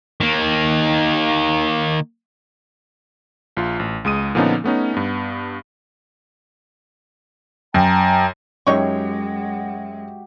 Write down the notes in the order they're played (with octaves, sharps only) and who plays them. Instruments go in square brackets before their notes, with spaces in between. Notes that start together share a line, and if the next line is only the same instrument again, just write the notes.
[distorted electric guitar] D#3 A#3
[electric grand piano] A#1 F4
A1
C#2 G#3 D#6 D#7
A#2 D3 F3 B3 C#4 D#4
A3 B3 C#4 D#4
G2 B3
[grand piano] F#2 [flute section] G5 A5 A#5
[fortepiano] F#2 C#5 [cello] G#3 [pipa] D#4 C#6 [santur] F#4 G4 E5